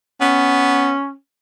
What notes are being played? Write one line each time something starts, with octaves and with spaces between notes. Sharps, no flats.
B3 C#4